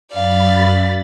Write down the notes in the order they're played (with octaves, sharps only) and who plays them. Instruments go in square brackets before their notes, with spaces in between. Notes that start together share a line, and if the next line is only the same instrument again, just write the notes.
[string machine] F#2 B5 A6 [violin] D5 F5